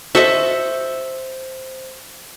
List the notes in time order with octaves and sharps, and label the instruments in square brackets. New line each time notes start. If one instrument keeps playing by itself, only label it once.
[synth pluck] F#4 A4 D#5 [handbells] C5 [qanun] E5